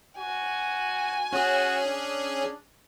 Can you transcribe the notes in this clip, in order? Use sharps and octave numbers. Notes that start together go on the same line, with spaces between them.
F#4 G#5
C#4 F#4 G#4
D4